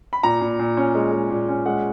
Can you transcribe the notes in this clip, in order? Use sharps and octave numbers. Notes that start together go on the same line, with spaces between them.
B5
A#2 A#5
A#2
A#2
C#4
G#3
G#3
A#2
C#4
G#3 F#5